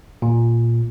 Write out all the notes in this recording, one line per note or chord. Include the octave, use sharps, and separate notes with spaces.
A#2